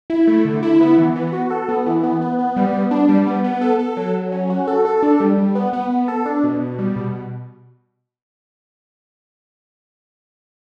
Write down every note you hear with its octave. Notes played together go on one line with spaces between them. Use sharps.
E4
A3
D3
E4
B3
E3
B3
F#4
A4
B3
E3
B3
B3
B3
G3
B3
D4
G3
B3
B3
A4
A4
F#3
F#3
C#4
F#4
A4
A4
D4
G3
G3
B3
B3
B3
A4
D4
B2
B2
G3
B2